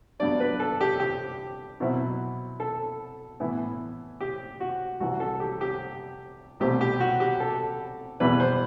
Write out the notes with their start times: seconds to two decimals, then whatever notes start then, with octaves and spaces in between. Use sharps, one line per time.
0.19 G2 F#3 B3 D4 D5
0.40 B4
0.60 A4
0.81 G4
1.00 G4
1.80 B2 F#3 C4 E4
2.60 A4
3.40 A2 E3 B3 E4
4.21 G4
4.60 F#4
5.00 C2 C3 E3 F#4
5.20 A4
5.40 G4
5.61 G4
6.60 C2 B2 A3 C4 G4
6.81 G4
7.00 F#4
7.20 G4
7.40 A4
8.20 E2 B2 G3 B3 E4 B4
8.40 C5